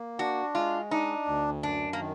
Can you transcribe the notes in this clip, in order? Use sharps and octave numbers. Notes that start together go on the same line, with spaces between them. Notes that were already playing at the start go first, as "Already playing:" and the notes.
Already playing: A#3
D4 F#4
G#3 F4
D4 D#4
D2
F#2 D4
A#3
D#3